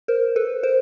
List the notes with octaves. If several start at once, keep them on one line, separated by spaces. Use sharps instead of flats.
A#4 C5
A4 B4
A#4 C5